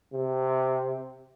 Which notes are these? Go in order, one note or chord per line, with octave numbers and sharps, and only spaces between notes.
C3